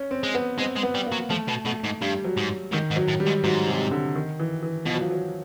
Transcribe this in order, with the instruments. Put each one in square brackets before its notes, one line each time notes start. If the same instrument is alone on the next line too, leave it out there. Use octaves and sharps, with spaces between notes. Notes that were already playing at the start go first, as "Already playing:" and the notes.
Already playing: [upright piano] C#4
C4
[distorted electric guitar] G#3
[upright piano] B3
[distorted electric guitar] G#3 [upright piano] C4
[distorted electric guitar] G#3
[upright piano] B3
[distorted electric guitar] G3
[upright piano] A#3
[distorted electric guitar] F#3
[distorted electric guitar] F3 [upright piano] A3
[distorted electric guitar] B2
[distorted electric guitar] B2 [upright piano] A3
[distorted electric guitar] G#2
[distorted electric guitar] G2 [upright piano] G3
[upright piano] F#3
[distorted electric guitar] G#2
[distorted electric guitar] G#2 [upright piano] D#3
[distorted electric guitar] G#2
[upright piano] F#3
[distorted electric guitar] A2
[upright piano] G3
[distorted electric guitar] G#2
[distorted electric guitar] G#2 [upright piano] F#3
[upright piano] C3
D3
D#3
E3
E3
[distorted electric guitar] B2 [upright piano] F3
[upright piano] F#3
F3
F#3